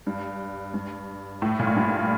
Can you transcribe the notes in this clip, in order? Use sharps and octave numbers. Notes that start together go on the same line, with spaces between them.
G2
G2
A2
A#2
A2
G2